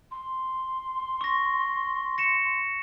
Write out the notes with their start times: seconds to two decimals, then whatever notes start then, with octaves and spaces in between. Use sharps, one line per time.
0.11 C6
1.21 C#6 A#6
2.18 A#6 C#7 E7